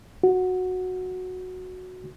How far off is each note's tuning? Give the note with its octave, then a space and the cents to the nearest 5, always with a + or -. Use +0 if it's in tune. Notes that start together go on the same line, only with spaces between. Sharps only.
F#4 -10